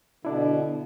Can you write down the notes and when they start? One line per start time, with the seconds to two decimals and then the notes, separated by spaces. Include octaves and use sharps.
0.25 B2 D3 D4 E4